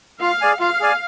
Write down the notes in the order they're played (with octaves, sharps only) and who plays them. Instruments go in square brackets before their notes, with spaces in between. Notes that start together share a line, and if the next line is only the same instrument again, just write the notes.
[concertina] F4 [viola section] F5
[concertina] G#4 D5 G#5
[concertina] F4 [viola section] F5
[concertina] G#4 D5 G#5